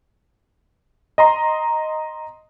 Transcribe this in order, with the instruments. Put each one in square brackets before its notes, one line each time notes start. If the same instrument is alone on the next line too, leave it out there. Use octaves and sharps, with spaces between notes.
[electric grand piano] D#5 A#5 C6